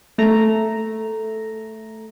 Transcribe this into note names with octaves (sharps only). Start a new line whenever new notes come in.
A3 A#5